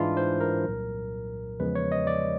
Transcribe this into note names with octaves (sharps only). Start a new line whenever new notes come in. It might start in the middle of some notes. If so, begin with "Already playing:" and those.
Already playing: G#2 E3 G#3 D4 E4 F4
C5
A#4
C2 A#2 F#3
E2 C#3 F3 G#3 B4
C#5
D#5
D5